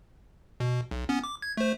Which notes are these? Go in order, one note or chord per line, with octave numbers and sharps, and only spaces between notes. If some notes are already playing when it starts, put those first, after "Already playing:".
B2
B1
B3 C#4
D6
G#6
A3 C5